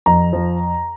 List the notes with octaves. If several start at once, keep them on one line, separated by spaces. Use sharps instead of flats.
F2 A#5
F3